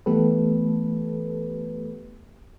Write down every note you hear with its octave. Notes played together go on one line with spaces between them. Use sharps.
E3 A3 B3 G4 A4 B4